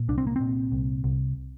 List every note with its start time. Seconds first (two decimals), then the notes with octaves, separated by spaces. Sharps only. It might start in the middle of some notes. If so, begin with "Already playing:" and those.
Already playing: A#2
0.08 C2 D4
0.18 C4
0.27 A#3
0.36 A#2 C4
0.72 C2
1.04 C2